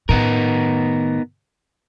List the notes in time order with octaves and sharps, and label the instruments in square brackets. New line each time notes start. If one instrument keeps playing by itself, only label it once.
[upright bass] A2 D#3 [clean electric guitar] B3 D#4 A#4